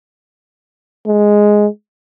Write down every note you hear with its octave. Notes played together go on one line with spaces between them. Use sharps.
G#3